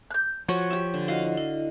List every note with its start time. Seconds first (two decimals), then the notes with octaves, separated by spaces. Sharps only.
0.11 F#6 G6
0.48 F3 F#4 C#5
0.70 G4 E5
0.94 D3
1.08 E4 F#4 D#5 F5
1.35 E4 D#5